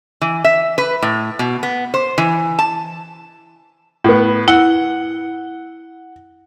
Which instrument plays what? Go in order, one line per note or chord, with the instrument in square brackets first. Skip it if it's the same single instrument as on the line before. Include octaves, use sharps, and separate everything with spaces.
[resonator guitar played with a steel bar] E3
E5
B4
A2
B2
B3
C5
E3
A5
[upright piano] A2 B3
[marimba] E4 [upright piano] F#5